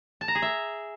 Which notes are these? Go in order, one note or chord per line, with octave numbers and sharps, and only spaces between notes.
A5
A#5
G#4
E5